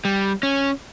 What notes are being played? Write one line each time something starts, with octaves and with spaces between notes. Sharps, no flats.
G3
C#4